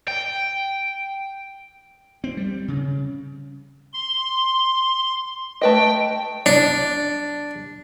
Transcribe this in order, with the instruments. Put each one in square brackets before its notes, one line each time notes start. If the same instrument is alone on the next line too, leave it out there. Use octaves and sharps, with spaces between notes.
[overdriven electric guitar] G5
[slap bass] C4
G3
C#3
[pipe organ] C6
[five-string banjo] A3 B4 D#5 [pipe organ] G5
[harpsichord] D4